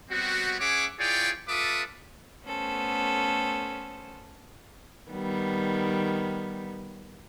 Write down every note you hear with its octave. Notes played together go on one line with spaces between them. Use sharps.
G3 B3 C4 F#4
C#4 G#4 C#5 E5 F#5 D6
E4 F4 G#4 C#5 D5 G5
F4 A4 B4 E5 D6 D#6
A3 B3 C#4 A4 C5
D#3 G3 B3